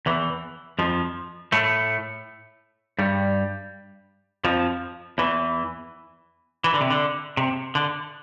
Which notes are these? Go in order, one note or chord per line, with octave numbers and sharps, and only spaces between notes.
E2 E3
F2 F3
A2 A3
G2 G3
F2 F3
E2 E3
E3
D3
C3
D3
C3
D3